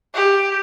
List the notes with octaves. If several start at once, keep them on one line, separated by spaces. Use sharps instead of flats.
G4